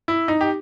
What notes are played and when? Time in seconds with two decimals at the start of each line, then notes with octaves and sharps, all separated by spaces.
0.08 E4
0.28 D#4
0.41 G4